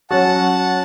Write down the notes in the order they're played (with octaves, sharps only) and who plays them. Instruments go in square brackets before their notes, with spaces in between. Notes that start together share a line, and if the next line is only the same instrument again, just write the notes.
[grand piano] F#3 C#4 F#4 [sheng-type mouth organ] F#5 A5